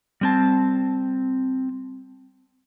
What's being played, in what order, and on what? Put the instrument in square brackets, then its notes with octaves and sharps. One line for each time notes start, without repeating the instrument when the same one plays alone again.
[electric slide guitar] G3 C4 A5